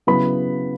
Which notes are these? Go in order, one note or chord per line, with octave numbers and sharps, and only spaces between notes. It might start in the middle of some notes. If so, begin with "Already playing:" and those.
C#3 F#3 B3 E4 B5